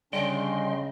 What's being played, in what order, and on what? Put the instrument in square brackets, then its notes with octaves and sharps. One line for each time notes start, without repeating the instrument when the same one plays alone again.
[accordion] D2 C#4 D4 [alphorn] C#3 [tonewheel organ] G3 G5 C6 [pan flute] D#5